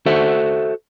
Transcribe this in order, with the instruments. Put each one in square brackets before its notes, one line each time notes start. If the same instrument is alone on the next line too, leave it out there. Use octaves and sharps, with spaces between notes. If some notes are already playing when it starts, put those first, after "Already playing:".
[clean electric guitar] F#4 A4 C5 E5